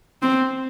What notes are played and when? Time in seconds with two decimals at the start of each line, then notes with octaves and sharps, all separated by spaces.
0.22 C4